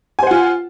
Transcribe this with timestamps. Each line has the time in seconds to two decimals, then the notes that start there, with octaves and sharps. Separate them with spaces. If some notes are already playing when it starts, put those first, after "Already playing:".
0.19 G#5
0.23 C5
0.27 F#5
0.31 F4